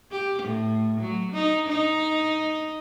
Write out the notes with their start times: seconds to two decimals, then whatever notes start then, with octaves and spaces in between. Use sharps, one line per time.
0.12 G4
0.43 A2
1.00 F#3
1.33 D#4
1.68 D#4